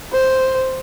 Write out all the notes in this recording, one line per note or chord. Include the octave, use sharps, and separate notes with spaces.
C5